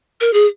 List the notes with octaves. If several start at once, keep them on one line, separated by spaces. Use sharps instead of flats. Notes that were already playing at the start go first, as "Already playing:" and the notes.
A#4
G#4